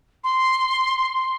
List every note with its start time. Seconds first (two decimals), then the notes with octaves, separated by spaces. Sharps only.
0.24 C6